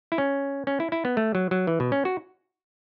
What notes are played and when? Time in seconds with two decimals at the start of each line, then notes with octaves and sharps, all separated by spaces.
0.12 E4
0.18 C#4
0.67 C#4
0.80 E4
0.92 E4
1.05 B3
1.17 A3
1.35 F#3
1.51 F#3
1.67 E3
1.80 B2
1.92 C#4
2.05 F#4